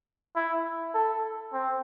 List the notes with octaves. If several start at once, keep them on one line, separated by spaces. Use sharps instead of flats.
E4
A4
C4